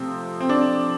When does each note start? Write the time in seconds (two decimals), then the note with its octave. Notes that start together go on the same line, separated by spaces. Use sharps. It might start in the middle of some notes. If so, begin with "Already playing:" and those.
Already playing: C3 F3 A3 C4
0.40 C4
0.49 D4